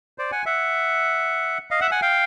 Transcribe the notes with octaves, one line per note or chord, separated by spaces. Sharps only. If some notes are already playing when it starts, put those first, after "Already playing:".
C5 D5
F#5 G#5
E5 F#5
D#5 F5
E5 F#5
F#5 G#5
F5 G5